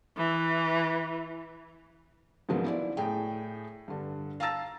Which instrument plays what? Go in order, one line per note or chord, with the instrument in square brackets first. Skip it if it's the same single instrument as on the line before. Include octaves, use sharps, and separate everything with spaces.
[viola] E3
[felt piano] G#2 C#3 F3 F#3 A#3 B3
E4 D5
A2 G#4 G5
G2 D3
F5 A5 A#5 E6 A6